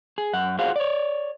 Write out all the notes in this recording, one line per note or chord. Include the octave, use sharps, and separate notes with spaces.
G#4
F#2 F#5
F4 F#4 G#4 C5 F5 F#5
C#5 D5